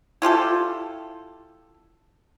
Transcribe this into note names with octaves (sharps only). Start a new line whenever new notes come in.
E4 F4 G4 A4